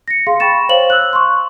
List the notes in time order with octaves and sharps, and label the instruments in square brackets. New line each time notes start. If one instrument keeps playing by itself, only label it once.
[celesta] A#6 C#7
G#4 F5 C6
G5 B5 C#6 A6 E7
C5 C#5 F5 F#7
E6 F#6
C6 C#6